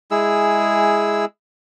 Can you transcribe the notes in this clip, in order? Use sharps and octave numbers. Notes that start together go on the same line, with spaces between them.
G#3 E4 G#4 E6